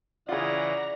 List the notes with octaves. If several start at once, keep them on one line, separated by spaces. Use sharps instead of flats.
C#3 E3 F4 G#4 D5 F#5 A#5